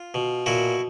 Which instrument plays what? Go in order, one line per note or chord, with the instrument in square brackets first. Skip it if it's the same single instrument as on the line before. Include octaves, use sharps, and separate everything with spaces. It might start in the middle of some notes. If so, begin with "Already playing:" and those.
Already playing: [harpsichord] F4
B2
A#2 E4 F#4